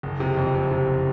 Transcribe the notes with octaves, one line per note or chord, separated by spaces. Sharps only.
F#1
C3
F2
C3
C3
F#1